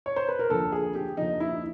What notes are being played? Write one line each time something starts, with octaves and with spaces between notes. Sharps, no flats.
C#5
C5
B4
A#4
D#2 D3 F3 A4
G#4
G4
D#2 D3 F3 D#4
E4